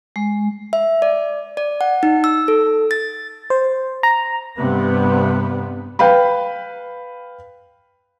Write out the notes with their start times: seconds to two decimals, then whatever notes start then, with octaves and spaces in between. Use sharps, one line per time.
0.16 G#3
0.73 E5
1.02 D5
1.57 D5
1.81 F#5
2.03 D#4
2.24 E6
2.48 A4
2.91 A6
3.50 C5
4.03 A#5
4.59 G2 C3 B3
5.99 B4 F5 G5 B5